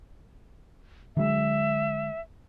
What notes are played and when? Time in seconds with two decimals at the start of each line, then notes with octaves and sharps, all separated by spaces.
1.17 D3 F#3 G#3 E5